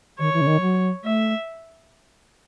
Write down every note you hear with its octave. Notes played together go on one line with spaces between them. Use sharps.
D#3 C#5
E3
C#3
D#3
F#3
A3 E5